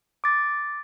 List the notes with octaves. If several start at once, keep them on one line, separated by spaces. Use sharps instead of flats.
D6 A6